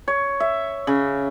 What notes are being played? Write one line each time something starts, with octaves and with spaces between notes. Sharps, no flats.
C#5
E5
C#3